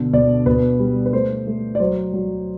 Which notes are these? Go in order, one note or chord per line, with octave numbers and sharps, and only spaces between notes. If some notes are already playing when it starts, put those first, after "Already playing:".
Already playing: B2 D3
B2 D5
B2 B4
G3
B4
A3 C5
A3
D5
F#3 C5
F#3